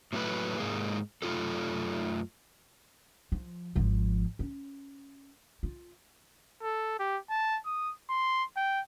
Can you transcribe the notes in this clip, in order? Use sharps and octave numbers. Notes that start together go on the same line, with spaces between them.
A2 F#3 A3 G#4 B4
G#2 G#3 A#3
F#2 A3 F4 G4 A4
F3
G#1 F3
C#4
F4
A4
G4
A5
D#6
C6
G5